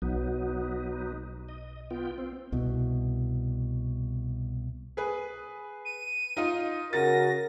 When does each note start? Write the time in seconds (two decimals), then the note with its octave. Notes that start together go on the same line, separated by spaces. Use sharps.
0.02 B1 F#3 B3 D#4
1.49 D#5
1.91 B3 F4 G5
2.18 C4
2.52 C2 B2
4.97 G#4 B4
5.85 D#7
6.37 D#4 F4
6.93 C#3 F#4 A#4 A6 A#6